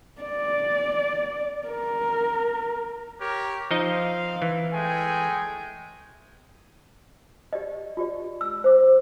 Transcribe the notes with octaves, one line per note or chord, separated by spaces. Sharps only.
D5
A#4
G4 A#4 C#5
F3 C4 D#4 D#5 F5
E3
G#3 A3 G5 G#5
G4 D5 D#5
F4 G4 D5
E6
C5 D6